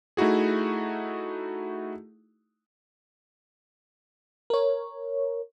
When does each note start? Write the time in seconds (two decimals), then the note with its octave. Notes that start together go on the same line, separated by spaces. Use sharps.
0.17 A3 D#4 E4 F#4 G#4
4.50 A#4 C#5